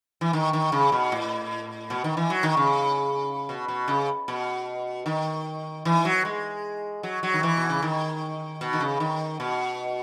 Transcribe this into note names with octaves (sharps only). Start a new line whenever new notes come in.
E3
D#3
D#3
C#3
B2
A2
B2
D#3
E3
F#3
D#3
C#3
B2
B2
C#3
B2
D#3
E3
F#3
G#3
F#3
F#3
D#3
E3
B2
C#3
D#3
B2
D#3
C#3
D#3
B2